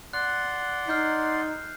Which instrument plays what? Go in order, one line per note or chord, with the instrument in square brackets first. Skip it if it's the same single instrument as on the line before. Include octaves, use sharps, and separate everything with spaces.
[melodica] D5 F#5 C6 [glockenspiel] F#6
[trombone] D#4 [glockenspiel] F6 G6 C7